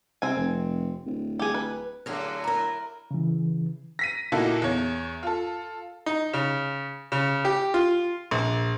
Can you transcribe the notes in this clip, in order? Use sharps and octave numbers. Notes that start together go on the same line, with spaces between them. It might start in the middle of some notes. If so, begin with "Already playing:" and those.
C3 C4 G#5
F1
D1
G4 G#4
B4
A2 D3 F#3 G4 G#4 A#4
E4 A#4 A#5
C#3 E3
A#6 B6 D#7
A#2 A#3 D#4 E4 F#4 A4
E2 C#5
F4 A4
D#4
C#3
C#3
G4
F4
A#1